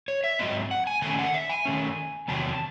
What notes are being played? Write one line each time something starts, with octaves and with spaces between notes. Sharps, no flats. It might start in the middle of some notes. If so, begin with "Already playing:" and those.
C#5
E5
G#2 F#3 C4 D#5
F#5
G#5
D#3 A3 C#4 G#5
F#5
E5
G#5
D#3 A3 C#4
E2 C3 D#3 F#3 A5